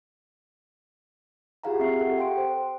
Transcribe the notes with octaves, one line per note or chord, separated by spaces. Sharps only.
F4 G4 G#4 F5 F#5 A#5
C4 E5 C7
G4 A4 F#5
A4 F5 G5 C6 D7
C5